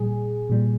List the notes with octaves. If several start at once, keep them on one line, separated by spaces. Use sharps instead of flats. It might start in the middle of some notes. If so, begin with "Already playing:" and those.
Already playing: A#2 G3 G#4
A#2 G3